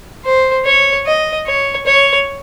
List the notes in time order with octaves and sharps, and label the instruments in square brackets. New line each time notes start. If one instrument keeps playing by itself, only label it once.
[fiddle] C5
C#5
D#5
C#5
C#5